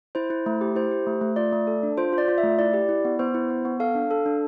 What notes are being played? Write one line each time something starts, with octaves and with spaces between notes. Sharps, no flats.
E4 C5
E4
A3
G4
E4 C5
G4
A3
A3
F4 D5
A3
A4
D4
F4 C5
F4
D5
F4
E5
A3
E4 D5
G4
E4
B3
B3 C5
E4
B3
B3
A4 F5
D4
A4
D4